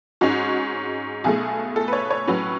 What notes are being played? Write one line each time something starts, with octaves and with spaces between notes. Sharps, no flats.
G#2 G#3 C#4 F#4
B1 B2 A3 G#4
A4
B4
C#5
C#5
A2 F#3 C#4 B4